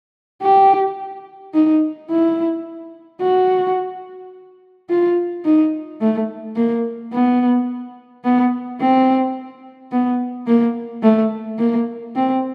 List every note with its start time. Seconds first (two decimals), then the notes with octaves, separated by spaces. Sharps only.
0.42 G4
1.54 D#4
2.10 E4
3.21 F#4
4.90 F4
5.45 D#4
6.01 A3
6.56 A#3
7.13 B3
8.24 B3
8.80 C4
9.92 B3
10.47 A#3
11.03 A3
11.59 A#3
12.16 C4